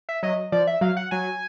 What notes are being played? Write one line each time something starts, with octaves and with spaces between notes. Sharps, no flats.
E5
F#3 D#5
F3 D5
E5
F#3 F5
F#5
F#3 G#5